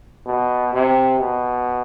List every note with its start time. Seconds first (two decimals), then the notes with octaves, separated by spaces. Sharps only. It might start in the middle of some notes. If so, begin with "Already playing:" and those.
0.26 B2
0.73 C3
1.19 B2